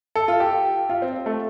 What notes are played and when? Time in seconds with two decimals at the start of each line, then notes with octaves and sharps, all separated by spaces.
0.16 A4
0.28 F4
0.40 G4
0.89 F4
1.02 C4
1.26 A3